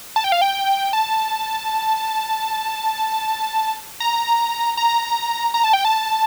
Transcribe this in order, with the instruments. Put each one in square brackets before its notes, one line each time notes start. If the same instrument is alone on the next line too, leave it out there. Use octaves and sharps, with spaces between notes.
[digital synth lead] A5
G5
F5
G5
A5
A#5
A#5
A#5
A5
G5
A5